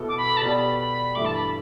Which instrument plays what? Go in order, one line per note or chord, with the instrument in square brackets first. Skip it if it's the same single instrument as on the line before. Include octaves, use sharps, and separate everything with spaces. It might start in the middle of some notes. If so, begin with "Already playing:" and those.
Already playing: [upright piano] B2 B3 E4 A4
[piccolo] D6
B5
A5
[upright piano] B2 B3 G4 D5 [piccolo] B5
[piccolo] B5
[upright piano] G2 E3 A3 E4 [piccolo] D6
[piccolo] A5
B5